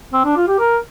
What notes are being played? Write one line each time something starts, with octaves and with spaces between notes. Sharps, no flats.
C4
D4
F4
G4
A#4